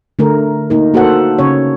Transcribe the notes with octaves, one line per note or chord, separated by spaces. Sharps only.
D3 A3 A#4
A#3 D#4 A#4
A#3 F#4 A4 C5 F#5
C#3 C#4 C#5